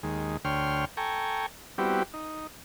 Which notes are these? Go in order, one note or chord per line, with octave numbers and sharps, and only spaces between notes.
D#2 G#3
D2 C#5 G5 C6 F6
A4 G5 G#5 A#5 C#6
G3 B3 C4 E4 F#4 G4
D#4